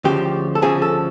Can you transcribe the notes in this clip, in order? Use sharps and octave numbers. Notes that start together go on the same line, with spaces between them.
D2 C#3 F3 G4
A4
D2 C#3 F3 G#4
A4